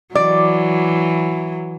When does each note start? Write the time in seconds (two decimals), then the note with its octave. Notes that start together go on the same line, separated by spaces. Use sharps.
0.15 E3 F#3 D5